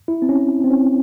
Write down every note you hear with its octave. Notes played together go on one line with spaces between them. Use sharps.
E4
C4
C#4
C4
C#4